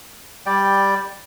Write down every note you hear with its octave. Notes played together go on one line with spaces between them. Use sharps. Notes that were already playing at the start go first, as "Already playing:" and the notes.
G3 D5 G5